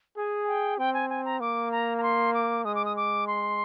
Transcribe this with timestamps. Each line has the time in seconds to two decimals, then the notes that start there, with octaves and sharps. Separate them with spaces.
0.16 G#4 G#5
0.47 G5
0.78 C4 G5
0.94 G#5
1.10 G#5
1.25 A#5
1.40 A#3 D6
1.72 A#5
1.98 A#5
2.03 C6
2.34 D6
2.65 G#3 D#6
2.75 D6
2.85 D#6
2.96 D6
3.27 C6